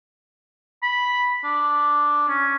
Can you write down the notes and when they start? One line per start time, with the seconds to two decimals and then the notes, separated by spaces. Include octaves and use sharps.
0.83 B5
1.44 D4
2.29 C#4